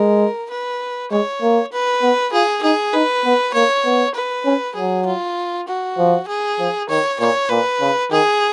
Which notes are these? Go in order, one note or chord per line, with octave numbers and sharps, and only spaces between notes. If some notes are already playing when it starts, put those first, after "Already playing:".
Already playing: G#3 A#4
B4
G#3 C#5
A#3
B4
B3
F4 G#4
D#4 G#4
D#4 B4
B3
A#3 C#5
B3
B4
C#4
F#3 G#4
F4
F#4
F3
G#4
F3
D#3 C#5
A#2 C#5
A#2 B4
C#3
D#3 G#4